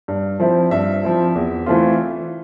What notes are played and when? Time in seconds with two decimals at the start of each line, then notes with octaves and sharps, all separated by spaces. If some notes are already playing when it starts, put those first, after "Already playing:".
0.08 G2
0.40 F3 C4 E4
0.71 G2 E5
1.03 F3 C4 E4
1.35 E2
1.66 E3 A3 C4 F4